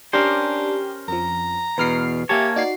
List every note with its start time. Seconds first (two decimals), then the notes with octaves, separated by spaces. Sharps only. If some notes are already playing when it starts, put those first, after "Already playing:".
0.13 C#4 D4 G4 A#4 C5
1.08 F2 F3 A#5
1.78 E2 B2 B4 F6 C7
2.29 A#3 G4 C#5 E5 G#5 A5
2.56 D#4 F#4 D5 C7